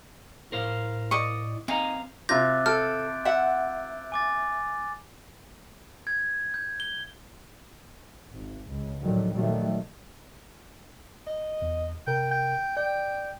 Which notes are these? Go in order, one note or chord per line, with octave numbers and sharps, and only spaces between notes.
A2 A#4 C5 F5
D5 D#5 C#6
C4 D#4 F5 G#5 A#5
C3 F4 D6 F#6 G6 A6 A#6
A4 F6 G6 D7
E5 F#5
G#5 D6 A6
G#6
G6
G7
G#1
C#2
F2 A2 D3 D#3 F#3 G3
A#2 D#3 F#3 G3 A3
D#5
E2
C3 A#4 G5
G5
D5 G5